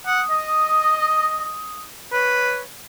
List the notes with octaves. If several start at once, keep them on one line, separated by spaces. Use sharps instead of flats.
F#5 D#6
D#5
B4 C#5